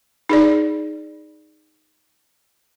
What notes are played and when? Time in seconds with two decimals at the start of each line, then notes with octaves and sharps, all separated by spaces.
0.29 D#4 G#4 D5